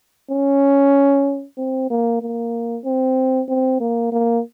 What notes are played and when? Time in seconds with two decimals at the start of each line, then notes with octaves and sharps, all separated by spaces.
0.31 C#4
1.57 C4
1.90 A#3
2.21 A#3
2.85 C4
3.48 C4
3.80 A#3
4.12 A#3